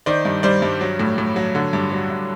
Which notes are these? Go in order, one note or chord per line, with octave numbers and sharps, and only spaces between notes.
D#3 C5 D5
G2
G3 C5 D5
G2
F#3
A2
A2
F#3
D3
G2
F#3
G2